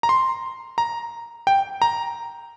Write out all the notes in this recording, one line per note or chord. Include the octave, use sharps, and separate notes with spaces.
A#5
C6
A#5
G5
A#5